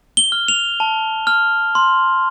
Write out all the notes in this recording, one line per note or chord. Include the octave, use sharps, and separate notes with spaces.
G7
F6
F7
A5
F6
C6